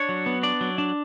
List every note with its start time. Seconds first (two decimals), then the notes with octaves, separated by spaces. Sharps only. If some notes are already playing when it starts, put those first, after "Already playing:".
Already playing: D4 C#5
0.09 F#3
0.26 B3
0.43 D4 D5
0.61 F#3
0.78 D4